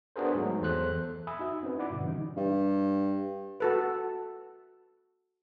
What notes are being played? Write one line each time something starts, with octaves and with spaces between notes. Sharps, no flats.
B3 D4 F#4 G#4 A#4 C5
G#2 F#3 A3
E2 A4 C5 F#6
E5 G#5 B5 D#6 E6
D#4 F#4 E5
C4 C#4 D#4 B4
E4 F#4 D5 F#5 B5 D6
G2 B2 D3
E3 G3 C#4 D#4
G2
F#4 A4 B4